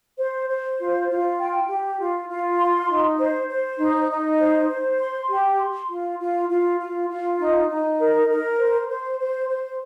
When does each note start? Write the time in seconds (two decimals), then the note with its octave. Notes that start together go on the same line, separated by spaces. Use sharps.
0.19 C5
0.49 C5
0.79 F4
1.09 F4
1.39 G5
1.68 G4
1.99 F4
2.29 F4
2.59 C6
2.89 D#4
3.19 C5
3.49 C5
3.79 D#4
4.09 D#4
4.38 C5
4.69 C5
4.99 C6
5.29 G4
5.59 C6
5.89 F4
6.19 F4
6.49 F4
6.79 F4
7.09 F4
7.39 D#4
7.70 D#4
7.99 A#4
8.29 A#4
8.59 C5
8.89 C5
9.20 C5
9.49 C5